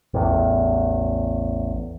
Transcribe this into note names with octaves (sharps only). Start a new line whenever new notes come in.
A1 E2